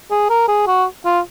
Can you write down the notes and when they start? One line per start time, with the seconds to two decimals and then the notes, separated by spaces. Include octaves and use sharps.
0.11 G#4
0.30 A#4
0.48 G#4
0.67 F#4
1.05 F4